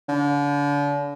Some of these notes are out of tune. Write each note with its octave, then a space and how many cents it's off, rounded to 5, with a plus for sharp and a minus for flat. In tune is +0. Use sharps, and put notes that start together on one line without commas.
D3 -35